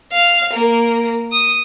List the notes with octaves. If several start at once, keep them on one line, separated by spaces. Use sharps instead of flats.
F5
A#3
D#6